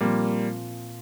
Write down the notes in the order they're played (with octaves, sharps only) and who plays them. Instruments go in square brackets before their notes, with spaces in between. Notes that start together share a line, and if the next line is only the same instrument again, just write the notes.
[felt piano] A#2 F3 C4 [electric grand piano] G3 A#3